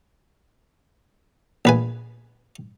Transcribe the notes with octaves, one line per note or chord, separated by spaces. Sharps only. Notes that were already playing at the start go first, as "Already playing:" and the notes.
A#1 B4 G#5